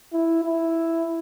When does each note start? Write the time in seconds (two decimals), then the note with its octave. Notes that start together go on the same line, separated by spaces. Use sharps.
0.13 E4
0.44 E4